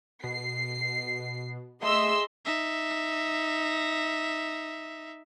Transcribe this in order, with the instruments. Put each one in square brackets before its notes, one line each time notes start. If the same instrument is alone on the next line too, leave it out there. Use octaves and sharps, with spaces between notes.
[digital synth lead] B2 [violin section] C7
[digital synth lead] A3 [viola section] G#4 D#5 E5 [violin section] C6 E6
[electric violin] D#4 E5